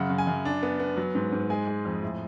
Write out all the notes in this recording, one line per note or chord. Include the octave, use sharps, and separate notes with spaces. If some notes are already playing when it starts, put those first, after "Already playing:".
Already playing: F#2 C#3 F#5
F#2
G#5
F#2
D4
B3
B3
F#3
G#2
G#2
G#3 G#5
G#3
F2
A2